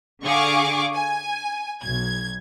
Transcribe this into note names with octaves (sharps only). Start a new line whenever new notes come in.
D3 G#4 F5 C#6 D6
G#5
B1 G#6